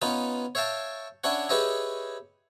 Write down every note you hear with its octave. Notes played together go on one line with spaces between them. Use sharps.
B3 C#4 D#4 F4 B4
C#5 E5 F5 G5 A5
C#4 D4 E4 C#5 F#5
G4 G#4 B4 C#5 D#5 E5